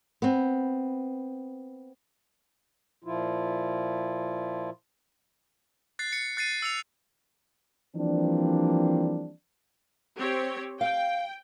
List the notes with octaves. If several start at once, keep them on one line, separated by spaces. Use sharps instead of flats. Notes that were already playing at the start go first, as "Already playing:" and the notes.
B3 C4
A#2 F3 E4 F4
F#6 A6 C7
C#7
F#6 A6 C7 D#7
E6 C#7 F7
E3 F3 G3 A#3 C4 D4
C4 G4 C#5
F5 G5